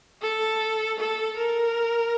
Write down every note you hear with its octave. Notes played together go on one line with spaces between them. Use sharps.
A4
A4
A#4